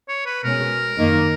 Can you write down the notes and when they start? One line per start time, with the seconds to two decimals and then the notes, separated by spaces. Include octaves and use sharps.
0.08 C#5
0.26 B4
0.44 B2 G#3 C#4 A#4
0.96 F#2 D#3 A#3 D#4